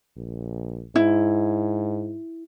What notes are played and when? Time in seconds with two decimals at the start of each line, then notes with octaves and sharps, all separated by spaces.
0.17 A#1
0.96 G#2 E4